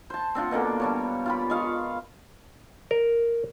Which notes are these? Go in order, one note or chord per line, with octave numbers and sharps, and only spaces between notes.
C5 A5
C4 D4 F4 F#5
B2 D3 A#3 G5
G3 D4 C#5
F4 G4 B5
G#3 F4 F5 C#6
A#4